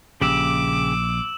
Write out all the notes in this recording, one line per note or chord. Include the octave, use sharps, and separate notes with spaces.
A#1 C#3 G4 D6 E6 E7 F#7